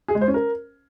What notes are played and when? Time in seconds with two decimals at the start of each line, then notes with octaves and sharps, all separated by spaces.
0.08 G#4
0.15 G#3
0.21 C5
0.28 C#4
0.34 A#4